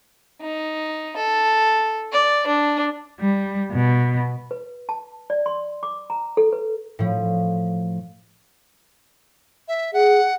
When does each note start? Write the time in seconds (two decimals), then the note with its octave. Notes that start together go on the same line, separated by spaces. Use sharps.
0.41 D#4
1.17 A4
2.12 D5
2.47 D4
3.20 G3
3.72 B2
4.51 B4
4.89 A5
5.30 D5
5.46 C6
5.83 D6
6.10 A#5
6.37 A4
6.53 B4
6.99 A2 F3
9.68 E5
9.93 G#4 F#5